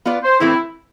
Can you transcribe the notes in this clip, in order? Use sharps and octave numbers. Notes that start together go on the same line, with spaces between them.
B3 F4 B4 D5
C5
A2 E3 A3 C4 E4